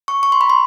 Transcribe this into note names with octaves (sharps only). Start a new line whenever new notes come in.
C#6
C#6
C6
B5
C6